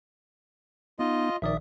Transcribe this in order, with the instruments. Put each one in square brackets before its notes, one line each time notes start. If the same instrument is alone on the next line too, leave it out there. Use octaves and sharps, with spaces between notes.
[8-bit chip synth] B3 D#4 [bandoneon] F4 D#5
[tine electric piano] A#1 D#3 D5 [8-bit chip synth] E5 D#6